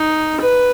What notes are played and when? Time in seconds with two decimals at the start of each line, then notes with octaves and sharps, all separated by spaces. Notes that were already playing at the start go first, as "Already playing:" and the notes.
Already playing: D#4
0.40 B4